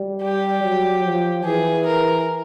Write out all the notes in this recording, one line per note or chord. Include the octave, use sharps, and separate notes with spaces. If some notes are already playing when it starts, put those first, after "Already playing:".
Already playing: G3
G4
F#3
F3
E3 G#4
A#4